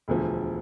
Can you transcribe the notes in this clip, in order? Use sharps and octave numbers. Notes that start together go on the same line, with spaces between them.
E1 D2 D3 F3